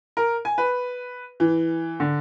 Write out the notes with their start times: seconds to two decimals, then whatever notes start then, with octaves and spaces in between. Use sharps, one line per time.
0.17 A#4
0.45 G#5
0.58 B4
1.40 E3
2.00 D3